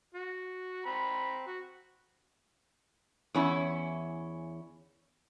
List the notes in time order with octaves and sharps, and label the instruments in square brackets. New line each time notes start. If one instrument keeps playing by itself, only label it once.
[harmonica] F#4
C4 A#5 B5
F#4
[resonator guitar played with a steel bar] E2 C#4 E4